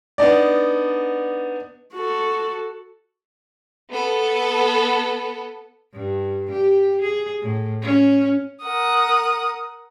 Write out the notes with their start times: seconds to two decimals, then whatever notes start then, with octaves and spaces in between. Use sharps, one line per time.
0.18 B3 D4 D#4 D5
1.93 F#4 A4
3.90 B3 A4
5.94 G2
6.51 G4
7.02 G#4
7.42 A2
7.82 C#4
8.61 A#4 F#5 D#6